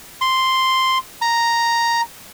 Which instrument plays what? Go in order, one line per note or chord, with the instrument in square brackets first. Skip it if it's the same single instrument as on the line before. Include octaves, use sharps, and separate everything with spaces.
[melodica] C6
A#5